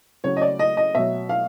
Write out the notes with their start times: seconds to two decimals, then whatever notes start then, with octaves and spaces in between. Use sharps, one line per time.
0.24 C#3 F#3 C#5
0.37 D#5
0.42 D5
0.59 D#5
0.77 D#5
0.95 B2 F#3 E5
1.29 F5